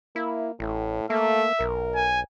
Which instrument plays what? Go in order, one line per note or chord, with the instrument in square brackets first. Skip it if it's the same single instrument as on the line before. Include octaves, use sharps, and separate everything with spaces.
[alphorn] A#3 [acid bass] E4
[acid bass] A1 [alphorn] A2
[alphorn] A3 [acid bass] A#3 [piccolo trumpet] E5
[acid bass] B1 [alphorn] A#4
[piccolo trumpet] G#5